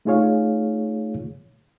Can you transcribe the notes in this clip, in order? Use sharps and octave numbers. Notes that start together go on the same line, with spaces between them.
A3 D#4 F4 G#4 C#5 F5